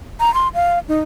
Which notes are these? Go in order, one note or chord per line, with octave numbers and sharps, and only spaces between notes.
A#5
C6
F5
D#4